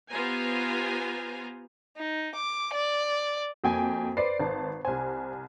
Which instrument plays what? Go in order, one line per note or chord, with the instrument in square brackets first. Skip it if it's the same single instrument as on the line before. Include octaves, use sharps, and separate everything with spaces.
[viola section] B3 F4 G4 C5 G#5 A#5
[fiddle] D#4
D6
D5
[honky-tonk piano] F2 G5 G#5 [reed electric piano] A#3 F#4
[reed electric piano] B4 C5 [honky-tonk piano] D5 C7
[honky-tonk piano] G#1 A5
[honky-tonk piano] C2 G#5 [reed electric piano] C5